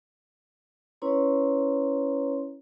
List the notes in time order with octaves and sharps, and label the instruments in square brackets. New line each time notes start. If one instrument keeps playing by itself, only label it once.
[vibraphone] C#4 E4 B4 C#5 A#5 C6